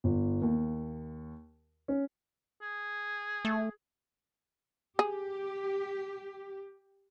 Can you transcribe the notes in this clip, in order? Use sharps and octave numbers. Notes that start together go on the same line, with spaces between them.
G1
D#2
C#4
G#4
A3
G4 G#4